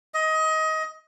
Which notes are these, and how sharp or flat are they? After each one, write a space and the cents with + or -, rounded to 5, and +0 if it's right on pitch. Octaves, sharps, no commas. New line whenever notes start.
D#5 +20